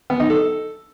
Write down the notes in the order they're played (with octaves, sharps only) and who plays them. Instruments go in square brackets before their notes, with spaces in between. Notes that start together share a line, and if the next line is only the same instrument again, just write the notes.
[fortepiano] B3
D#4
A4